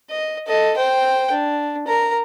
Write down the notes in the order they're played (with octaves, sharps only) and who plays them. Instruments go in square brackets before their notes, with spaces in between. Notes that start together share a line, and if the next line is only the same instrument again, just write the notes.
[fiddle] D#5
A4 D#5
C5 G5
D4
A#4 A#5